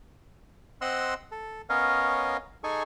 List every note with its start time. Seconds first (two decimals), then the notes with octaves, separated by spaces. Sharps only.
0.81 C4 D#5 F#5 C6 E6 F#6
1.31 A4
1.69 B3 C#4 A#4 C#5 D#5 F5
2.64 D#4 G#4 A4 G#5 C#6